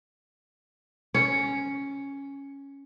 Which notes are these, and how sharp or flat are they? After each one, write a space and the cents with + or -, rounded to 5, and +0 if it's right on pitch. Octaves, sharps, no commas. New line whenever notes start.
C#4 +0 C#5 +5